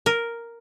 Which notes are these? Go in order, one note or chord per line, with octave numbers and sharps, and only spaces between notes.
A#4